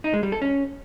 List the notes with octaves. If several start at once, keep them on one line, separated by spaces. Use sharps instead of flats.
D#4
G#3
G3
A4
C#4